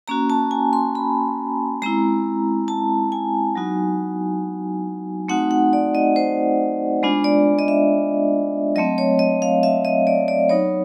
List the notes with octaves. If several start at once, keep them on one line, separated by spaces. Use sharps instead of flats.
A#3 C#4 F#4 A#5
A5
G#5
C6
B5
G#3 C4 E4 A#5
A5
G#5
F#3 B3 D#4 F#4
A3 C4 D#4 F#4 F#5
F#5
D5
D#5
C5
G#3 B3 D4 F4
D5
D#5
E5
F#3 A3 C4 D#5
C#5
D#5
F5
E5
D#5
D5
D5
F#3 B3 D#4 C#5